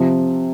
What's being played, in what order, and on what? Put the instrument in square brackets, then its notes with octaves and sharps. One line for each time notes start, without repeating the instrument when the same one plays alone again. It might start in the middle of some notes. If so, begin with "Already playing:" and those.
Already playing: [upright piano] C3 F3